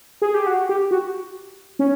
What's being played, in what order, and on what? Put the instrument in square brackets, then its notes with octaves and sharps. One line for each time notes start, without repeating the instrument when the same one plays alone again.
[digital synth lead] G#4
G4
F#4
G4
F#4
C#4